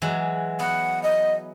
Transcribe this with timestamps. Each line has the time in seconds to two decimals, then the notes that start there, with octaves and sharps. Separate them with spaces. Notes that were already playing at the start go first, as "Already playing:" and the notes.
0.02 E3 F#3 G#3
0.59 B3 F#5
1.03 D#5